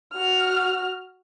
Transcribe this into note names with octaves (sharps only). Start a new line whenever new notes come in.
F#4 F6